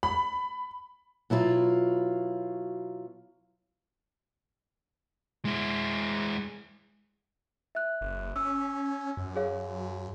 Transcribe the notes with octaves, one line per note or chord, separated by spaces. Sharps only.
B5
B2 F#3 E4 F4
G#3 E4
E5 F#6
F#1
C#4 E6
F#2
G#4 C#5 F5